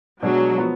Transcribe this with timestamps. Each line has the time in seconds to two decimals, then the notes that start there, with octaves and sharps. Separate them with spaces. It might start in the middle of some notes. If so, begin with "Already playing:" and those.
0.22 B2 F#3 G#3 D4 G#4
0.58 F3 B3